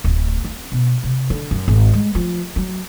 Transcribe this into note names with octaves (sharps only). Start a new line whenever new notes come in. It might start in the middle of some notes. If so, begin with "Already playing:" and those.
D1
C4
B2
C3
D3
F#2
G#1
G#3
F3
F#3